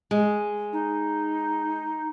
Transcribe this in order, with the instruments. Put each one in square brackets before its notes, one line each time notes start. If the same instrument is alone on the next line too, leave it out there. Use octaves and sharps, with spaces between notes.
[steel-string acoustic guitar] G#3
[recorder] D#4